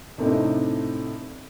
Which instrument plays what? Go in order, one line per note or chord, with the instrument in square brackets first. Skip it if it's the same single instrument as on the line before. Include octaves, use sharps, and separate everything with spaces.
[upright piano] A2 C3 A3 C4 D4 D#4